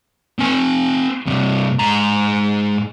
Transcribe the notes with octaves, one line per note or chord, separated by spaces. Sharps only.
C4 G#5
G2 C3
G#2 A#5